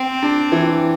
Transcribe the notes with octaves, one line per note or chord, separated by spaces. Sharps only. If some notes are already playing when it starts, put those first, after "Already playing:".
Already playing: C4
D4
E3